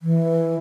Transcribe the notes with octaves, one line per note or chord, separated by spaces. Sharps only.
E3